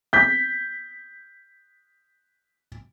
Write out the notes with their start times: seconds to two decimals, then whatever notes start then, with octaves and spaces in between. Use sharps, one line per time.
0.13 G6 B6